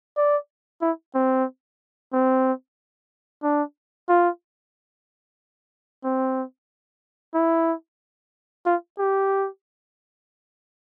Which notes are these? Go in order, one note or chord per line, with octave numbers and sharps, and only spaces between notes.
D5
E4
C4
C4
D4
F4
C4
E4
F4
G4